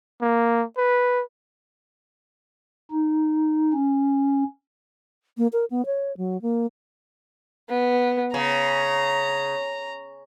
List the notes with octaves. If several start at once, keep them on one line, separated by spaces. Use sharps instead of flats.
A#3
B4
D#4
C#4
A#3
A#4
B3
C#5
F#3
A#3
B3
C#3 A#5